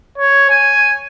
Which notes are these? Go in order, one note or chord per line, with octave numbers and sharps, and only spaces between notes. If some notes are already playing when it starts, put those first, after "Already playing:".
C#5
G#5